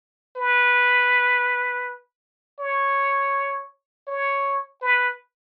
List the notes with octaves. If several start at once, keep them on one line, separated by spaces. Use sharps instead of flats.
B4
C#5
C#5
B4